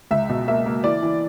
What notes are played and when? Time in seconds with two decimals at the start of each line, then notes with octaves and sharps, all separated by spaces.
0.11 C#2 E5
0.29 B2
0.48 A#3 E5
0.66 A#3
0.84 E3 D5
1.03 E3